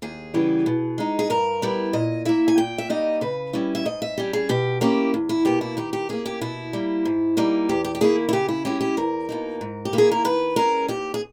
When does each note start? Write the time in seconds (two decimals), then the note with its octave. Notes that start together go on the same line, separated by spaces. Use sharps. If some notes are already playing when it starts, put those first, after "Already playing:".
0.02 D#2 G#4
0.34 C#3 E3 G3 B3
0.66 B2
0.98 G#3 D#4
1.19 G#4
1.30 G2 A#4
1.62 G3 B3 E4
1.93 A#2 D#5
2.25 A#3 E4 E5
2.48 G#5
2.58 A#2 G5
2.78 E5
2.89 G3 A#3 D#4 D#5
3.21 C#3 B4
3.53 G3 C#4 E4
3.75 E5
3.85 G#2 D#5
4.02 E5
4.18 G3 C#4 G4
4.33 G#4
4.49 B2 G4
4.81 A#3 C#4 E4 G4
5.14 E2
5.29 E4
5.45 B2 A#3 G4
5.61 E4
5.77 D#3 G4
5.93 G4
6.09 A#3 C#4 G#4
6.26 G4
6.41 B2 E4
6.73 G3 A#3
7.05 G#2
7.37 G3 A#3 D#4
7.69 E2 G4
7.85 G4
7.95 G4
8.01 D#3 A#3 E4 G#4
8.29 E4
8.33 C#3 G4
8.48 E4
8.65 G#3 C#4 E4 G4
8.81 G4
8.97 E2 A#4
9.29 B2 A#3 D#4
9.61 G#2
9.85 G4
9.93 D#3 A#3 E4
9.98 G#4
10.12 A#4
10.24 D#3 B4
10.56 G#3 C#4 A#4
10.88 D#2 G4
11.14 G#4